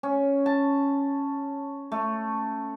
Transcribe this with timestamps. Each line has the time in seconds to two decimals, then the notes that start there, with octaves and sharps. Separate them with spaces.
0.03 C#4
0.46 A5
1.92 A3